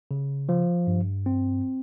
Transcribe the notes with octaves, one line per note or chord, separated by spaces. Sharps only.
C#3
F3
G2
C4